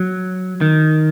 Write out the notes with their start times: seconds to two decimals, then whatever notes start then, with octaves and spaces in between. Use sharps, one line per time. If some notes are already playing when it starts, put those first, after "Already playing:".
Already playing: F#3
0.61 D#3